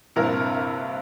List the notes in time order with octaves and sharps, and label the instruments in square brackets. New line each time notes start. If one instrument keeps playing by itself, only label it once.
[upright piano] A#1 G2 C3 [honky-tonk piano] E4 A#4